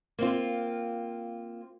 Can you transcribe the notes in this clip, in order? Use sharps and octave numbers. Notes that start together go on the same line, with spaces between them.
A#3 C4 F4